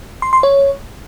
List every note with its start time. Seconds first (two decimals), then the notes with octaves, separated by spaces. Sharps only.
0.22 C6
0.33 C6
0.43 C#5